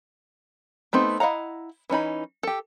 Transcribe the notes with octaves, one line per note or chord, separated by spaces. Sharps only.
A3 B3 C4 D#4
E4 D#5 F5 F#5 A#5
E3 C#4 D#4 B5
G4 A4